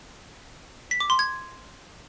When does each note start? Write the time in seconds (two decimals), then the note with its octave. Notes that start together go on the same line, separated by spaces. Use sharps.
0.91 B6
1.00 D6
1.10 C6
1.19 G#6